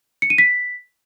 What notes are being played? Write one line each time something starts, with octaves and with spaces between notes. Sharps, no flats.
C#7
D#7
B6